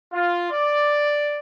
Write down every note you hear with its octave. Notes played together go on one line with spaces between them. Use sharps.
F4
D5